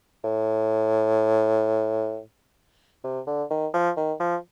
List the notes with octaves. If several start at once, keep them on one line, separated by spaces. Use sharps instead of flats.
A2
C3
D3
D#3
F3
D#3
F3